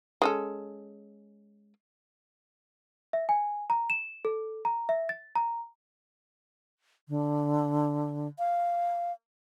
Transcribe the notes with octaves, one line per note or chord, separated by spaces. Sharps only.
G#3 C#4 A4
E5
G#5
A#5
E7
A4
A#5
E5
A6
A#5
D3
F5